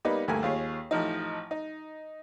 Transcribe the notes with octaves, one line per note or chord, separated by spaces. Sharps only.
G3 A#3 B3 D#4
D2 G2 A3 A#3 A#4 G#5
D#2 F4 G#4 C#5
A1 F3 D#4
D#4